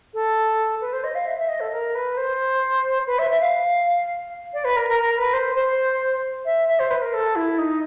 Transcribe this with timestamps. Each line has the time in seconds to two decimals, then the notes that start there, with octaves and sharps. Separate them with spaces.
0.14 A4
0.81 B4
0.93 C5
1.04 D#5
1.15 F5
1.27 E5
1.38 E5
1.49 D#5
1.60 A4
1.72 A#4
1.95 B4
2.17 C5
3.07 B4
3.19 E5
3.30 E5
3.41 F5
4.54 D5
4.64 B4
4.76 A#4
4.88 A#4
5.03 A#4
5.18 B4
5.33 C5
5.55 C5
6.45 E5
6.69 E5
6.79 C5
6.90 B4
7.02 A#4
7.14 A4
7.35 E4
7.58 D#4